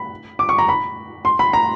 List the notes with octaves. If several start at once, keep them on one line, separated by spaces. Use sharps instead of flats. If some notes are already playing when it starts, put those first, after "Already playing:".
Already playing: B5
D6
C#6
A#5
B5
C6
B5
A#5